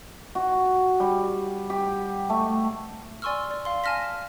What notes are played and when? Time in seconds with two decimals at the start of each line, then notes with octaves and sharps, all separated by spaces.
0.35 F#4
1.00 G3
1.70 G4
2.30 A3
3.22 D5 G#5 C6 C#6 E6 F6
3.51 D5
3.65 F5 C6
3.84 G#5 A5 F6 A#6 B6